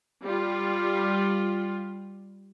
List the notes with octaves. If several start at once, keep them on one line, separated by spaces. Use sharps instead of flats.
G3 F4